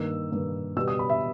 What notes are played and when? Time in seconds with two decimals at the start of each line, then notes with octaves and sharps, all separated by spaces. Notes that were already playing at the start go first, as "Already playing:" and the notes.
Already playing: G2 D#3 A#3 E6
0.31 G2 D#3 A#3
0.76 B2 G3 B3 E6
0.88 D#6
0.99 B5
1.10 E5